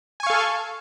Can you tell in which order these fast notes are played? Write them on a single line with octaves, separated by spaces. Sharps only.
G#5 C#6 F5 A4